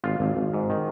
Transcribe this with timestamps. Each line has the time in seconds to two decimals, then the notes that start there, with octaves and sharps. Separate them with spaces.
0.04 G#1 F4
0.20 G#1
0.37 G#1
0.54 G#2
0.70 D#3